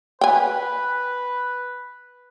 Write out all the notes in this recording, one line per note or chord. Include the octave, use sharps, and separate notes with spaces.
B4 G5 G#5